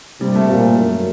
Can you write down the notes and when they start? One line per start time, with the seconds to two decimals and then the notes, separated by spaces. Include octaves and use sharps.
0.21 C3 G3
0.35 A3
0.49 A#2 A#3
0.78 F#2